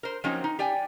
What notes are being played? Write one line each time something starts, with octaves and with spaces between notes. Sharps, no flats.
A#4 C5
F3 F#3 A#3 C4 C#4 D#4
D#4
G4 D5 G5 G#5